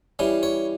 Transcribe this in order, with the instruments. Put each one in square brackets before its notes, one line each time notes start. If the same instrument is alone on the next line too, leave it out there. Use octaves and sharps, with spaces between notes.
[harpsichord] E3 G3 C#4
C#5